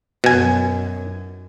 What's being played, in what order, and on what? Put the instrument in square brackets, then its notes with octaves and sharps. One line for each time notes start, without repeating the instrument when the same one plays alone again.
[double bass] F#2 [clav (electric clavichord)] B2 G#5